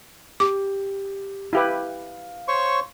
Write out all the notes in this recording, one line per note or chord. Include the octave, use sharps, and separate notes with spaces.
G4 D6
E4 G4 B4 F5
C5 C#5 C#6